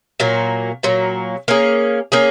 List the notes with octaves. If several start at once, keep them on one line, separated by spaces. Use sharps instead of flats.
A#2 F#3 A#3
A#2 F#3 A#3
A#3 C#4 G#4
A#3 C#4 G#4